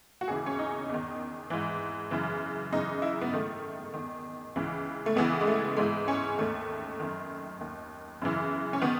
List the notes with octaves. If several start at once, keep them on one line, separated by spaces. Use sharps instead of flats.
F#4
D#2 C#3 E3 G#4
C#4
D#4
E2 D#3
G#2 E3
F#2 C#3 E3
F#2 C#3 E3 D#4
E4
B3
G#2 D#3 A3
E2 D#3
C#2 C#3 E3
A3
C#2 C#3 E3 B3
G#3
A3
G#2 E3 G#3
C#4
D#2 D#3 A3
F#2 D#3
D#2 D#3
F#2 C#3 E3
C#4
D#3 B3